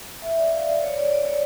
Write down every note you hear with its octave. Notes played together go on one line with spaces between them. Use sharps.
E5
D5
F5
D5
C#5
D5
D5
C#5